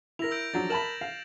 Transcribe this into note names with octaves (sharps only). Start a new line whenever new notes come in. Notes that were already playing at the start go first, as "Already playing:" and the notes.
E4 A#4 A#6 F7
E6 G6 D7
F3 F#3 D4 A6
A#4 A5 B5 E7 F#7
F5